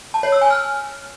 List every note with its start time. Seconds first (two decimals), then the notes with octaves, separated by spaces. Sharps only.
0.14 A5
0.23 C#5
0.32 E6
0.41 G#5
0.51 F6